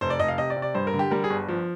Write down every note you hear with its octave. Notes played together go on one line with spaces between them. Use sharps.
F1 C5
D5
F1 D#5
F5
C3 D#5
D5
C3
D5
G2 C5
A#4
D3
G4
G3 A#4
G#4
G1
F3